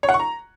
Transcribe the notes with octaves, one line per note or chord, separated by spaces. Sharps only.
C#5
F#5
C#6
A#5